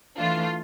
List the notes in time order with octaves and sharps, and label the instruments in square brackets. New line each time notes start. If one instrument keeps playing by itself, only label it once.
[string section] E3 A3 D4 F4